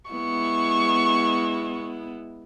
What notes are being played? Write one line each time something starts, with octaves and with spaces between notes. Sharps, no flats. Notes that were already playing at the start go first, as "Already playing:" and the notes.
G#3 B3 E4 C#6